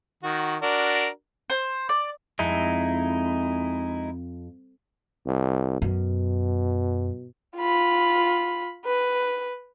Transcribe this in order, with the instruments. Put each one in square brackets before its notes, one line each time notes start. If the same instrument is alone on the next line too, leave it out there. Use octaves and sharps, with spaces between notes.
[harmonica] D#3 F#4
D4 F#4 A#4
[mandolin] C5
D5
[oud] F2 [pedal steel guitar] G#3 D#4 E4
[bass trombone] C2
[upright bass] F#2 [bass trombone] B2
[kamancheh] F4 B5
B4